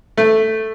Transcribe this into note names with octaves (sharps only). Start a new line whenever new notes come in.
A3